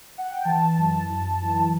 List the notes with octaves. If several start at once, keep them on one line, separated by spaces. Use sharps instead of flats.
F#5
G5
E3 A5
F#2
F#2
E3